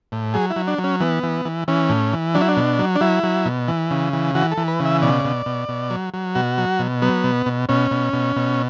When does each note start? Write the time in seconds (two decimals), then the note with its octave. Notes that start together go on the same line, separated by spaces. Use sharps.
0.12 A2
0.34 F#3 G#4
0.50 E4
0.56 F#3
0.67 D4
0.78 F#3
0.84 C#4
1.00 E3 B3
1.23 E3
1.45 E3
1.68 E3 C#4
1.90 A2
2.13 E3
2.34 F#3 D4
2.41 E4
2.49 D4
2.56 B2
2.79 F#3
2.96 D4
3.01 F#3 E4
3.23 F#3
3.46 B2
3.68 E3
3.91 C#3
4.13 E3
4.35 E3 F#4
4.51 A4
4.57 E3
4.68 B4
4.80 C#3
4.85 E5
5.02 B2 D5
5.25 B2
5.46 B2
5.69 B2
5.90 F#3
6.14 F#3
6.35 B2 F#4
6.58 F#3
6.79 B2
7.02 F#3 B3
7.24 B2
7.46 B2
7.69 B2 C#4
7.91 B2
8.13 B2
8.36 B2